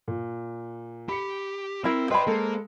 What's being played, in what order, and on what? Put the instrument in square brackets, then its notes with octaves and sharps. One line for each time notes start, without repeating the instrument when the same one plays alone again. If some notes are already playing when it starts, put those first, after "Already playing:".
[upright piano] A#2
[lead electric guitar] G4 [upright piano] B5 C#7
[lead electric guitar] C4 [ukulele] E4 A#4 [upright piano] E6
[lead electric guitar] B4 D5 [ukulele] C5 B5 [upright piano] D#5 G5
[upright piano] G#3 A4 [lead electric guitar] A#3